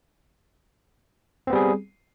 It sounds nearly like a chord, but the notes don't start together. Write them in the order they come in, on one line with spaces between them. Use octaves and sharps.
C4 B3 G3 G#4